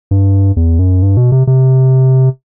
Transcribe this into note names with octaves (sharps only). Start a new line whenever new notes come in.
G2
E2
F#2
G2
B2
C3
C3